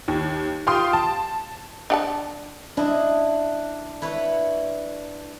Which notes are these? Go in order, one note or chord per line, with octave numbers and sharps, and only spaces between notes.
D#2
F4 G4 F5 G5 C6 D#6
A5
D4 F#5 A5
D4 E4 D#5
E4 B4 C#5